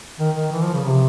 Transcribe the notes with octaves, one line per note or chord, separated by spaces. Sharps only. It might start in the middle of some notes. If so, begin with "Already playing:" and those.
D#3
D#3
E3
F3
C#3
C3